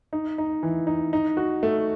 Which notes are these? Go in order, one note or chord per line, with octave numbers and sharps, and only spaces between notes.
D#4
D#4
E3
D#4
D#4
F#4
A3